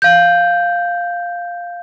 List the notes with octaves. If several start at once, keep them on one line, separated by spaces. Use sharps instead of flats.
F5 G6